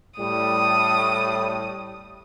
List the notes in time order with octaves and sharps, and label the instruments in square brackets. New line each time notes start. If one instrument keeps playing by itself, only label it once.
[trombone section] A2 G3 [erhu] D#6